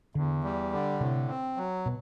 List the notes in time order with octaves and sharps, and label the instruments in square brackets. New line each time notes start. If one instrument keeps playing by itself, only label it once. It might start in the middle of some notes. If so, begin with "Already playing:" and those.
[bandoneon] E2 [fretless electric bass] D3
[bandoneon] G3
D3
[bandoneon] A2 [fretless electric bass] C3
[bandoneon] C4
F#3
[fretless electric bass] B2